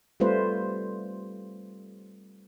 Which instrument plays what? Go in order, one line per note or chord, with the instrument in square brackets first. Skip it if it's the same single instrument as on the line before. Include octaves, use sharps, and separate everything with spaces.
[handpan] G3 A3 C4 F4 B4 C5